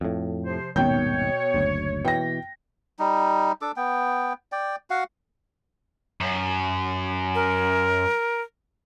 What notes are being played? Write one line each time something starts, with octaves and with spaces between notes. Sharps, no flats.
F2 A2
C3 F3 C5
D#1 G#1 B2 D#3 C#5 G5 G6
F#1 D2
B2 E3 G5 A#6
G3 D#4
D4 A4 D6
B3 G5
D5 G5
F#4 F5 F#5
F#2
A#4